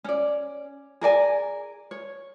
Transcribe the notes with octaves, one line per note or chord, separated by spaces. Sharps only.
C#4 D5
G#4 A#4 D5 G#5
C#5